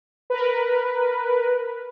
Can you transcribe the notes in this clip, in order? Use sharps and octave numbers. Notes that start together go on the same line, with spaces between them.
A#4 B4